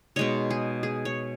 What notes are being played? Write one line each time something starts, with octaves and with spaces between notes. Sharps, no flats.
B2 G#3 D#4 C#5
G#4
G#4
C#5